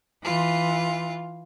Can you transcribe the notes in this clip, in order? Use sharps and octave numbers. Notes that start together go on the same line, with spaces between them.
E3 F4